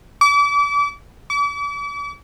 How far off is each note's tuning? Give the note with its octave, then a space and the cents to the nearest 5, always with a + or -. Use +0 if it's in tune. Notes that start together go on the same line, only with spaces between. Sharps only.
D6 -35
D6 -40